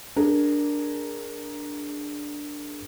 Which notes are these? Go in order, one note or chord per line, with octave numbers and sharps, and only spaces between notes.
D4 G#4 A#4